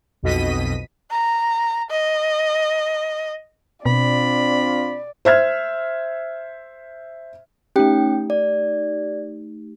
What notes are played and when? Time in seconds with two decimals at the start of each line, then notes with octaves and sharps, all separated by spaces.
0.23 B1 F2 B2 D#5 B6 D#7
1.11 A#5
1.90 D#5
3.86 B2 C4 D4 F4 D5 B5
5.25 C5 E5 F6 G#6
7.76 A3 C#4 D#4 G4 G5
8.30 D5